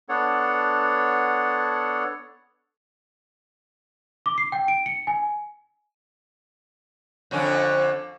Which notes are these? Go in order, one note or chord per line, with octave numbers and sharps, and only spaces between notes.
B3 D4 A4 C#5 F#5
D6
C7
G5
D7
C#7
G#5
F2 D3 C#4